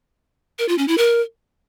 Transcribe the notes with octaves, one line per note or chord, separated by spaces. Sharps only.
A#4
F4
C#4
E4
A#4